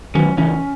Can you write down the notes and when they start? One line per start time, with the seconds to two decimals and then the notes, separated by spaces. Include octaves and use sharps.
0.15 D#3 F#3 C#4
0.37 C#3 E3 C#4